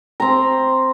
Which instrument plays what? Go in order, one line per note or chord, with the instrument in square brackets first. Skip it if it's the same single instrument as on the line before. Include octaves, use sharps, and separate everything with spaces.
[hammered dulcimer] C4 A#5